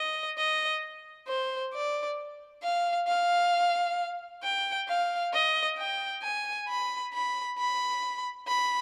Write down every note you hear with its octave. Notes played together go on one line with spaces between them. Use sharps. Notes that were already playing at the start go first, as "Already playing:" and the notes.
Already playing: D#5
D#5
C5
D5
F5
F5
G5
F5
D#5
G5
G#5
B5
B5
B5
B5